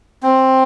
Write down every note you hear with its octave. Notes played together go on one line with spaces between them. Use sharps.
C4